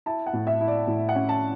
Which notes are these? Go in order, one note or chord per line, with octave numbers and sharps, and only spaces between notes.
E4 A5
F#5
A2
E5
E4
D5
A2
F#5
C#4
A5